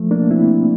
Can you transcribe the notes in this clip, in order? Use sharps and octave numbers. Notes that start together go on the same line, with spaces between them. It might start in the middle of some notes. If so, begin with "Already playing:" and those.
Already playing: F3 A3
A#3 D4
C4 E4